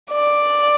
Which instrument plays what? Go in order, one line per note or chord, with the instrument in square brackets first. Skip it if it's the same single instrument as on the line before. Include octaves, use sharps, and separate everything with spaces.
[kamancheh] D5